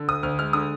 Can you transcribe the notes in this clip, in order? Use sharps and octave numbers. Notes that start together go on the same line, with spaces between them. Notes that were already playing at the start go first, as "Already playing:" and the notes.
Already playing: D3
D2 D#6
D2 F6
G#3 F6
D3 D#6